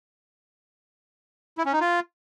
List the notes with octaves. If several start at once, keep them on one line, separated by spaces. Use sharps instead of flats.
E4
C#4
D#4
F4